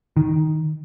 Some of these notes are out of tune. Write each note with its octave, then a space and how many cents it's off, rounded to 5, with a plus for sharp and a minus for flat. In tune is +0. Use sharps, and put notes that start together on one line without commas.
D#3 +5